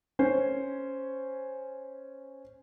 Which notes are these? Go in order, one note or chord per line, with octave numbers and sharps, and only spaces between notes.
C#4 C5